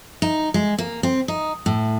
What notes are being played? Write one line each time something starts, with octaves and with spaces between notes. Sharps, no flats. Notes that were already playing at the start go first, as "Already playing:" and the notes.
D#4
G#3
A#3
C4
D#4
A2